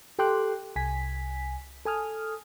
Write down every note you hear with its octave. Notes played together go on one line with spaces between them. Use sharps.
G4 A4 G5 C6 D6 F#6
C2 G#5 B6
A4 G#5 D#6 F6